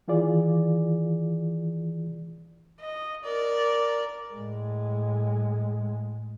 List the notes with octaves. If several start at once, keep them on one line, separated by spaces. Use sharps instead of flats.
D#3 E3 F4 G#4 D5
D#5
A#4 D5
A2 G#3